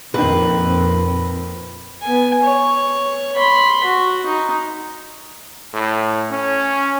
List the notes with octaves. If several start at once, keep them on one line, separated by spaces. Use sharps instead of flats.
A#1 F2 A#2 D#3 F3 A#3 C4 B4
B3 G#5
C#5
B5 C6
F#4
D#4
A2
C#4